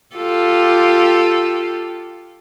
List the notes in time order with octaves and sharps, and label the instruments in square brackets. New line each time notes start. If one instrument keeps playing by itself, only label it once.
[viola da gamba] F4 G4 A4